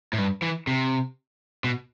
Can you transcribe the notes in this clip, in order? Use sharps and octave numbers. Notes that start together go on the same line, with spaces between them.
A2
G2
E3
C3
B2